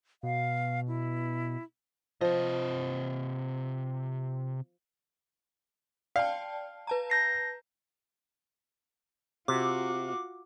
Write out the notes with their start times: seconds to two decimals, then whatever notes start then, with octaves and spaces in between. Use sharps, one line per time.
0.23 B2 F5
0.88 E4
2.21 C3 F3 D#5
6.16 D5 F5 G5 A5
6.87 B4 A5 A#5
7.10 G6 A#6 C7
9.48 C3 F4 F#4 D6